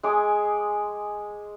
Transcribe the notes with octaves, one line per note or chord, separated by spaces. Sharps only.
G#3 G#5 D6 D#6